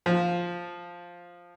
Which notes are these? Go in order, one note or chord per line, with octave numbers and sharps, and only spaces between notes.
F3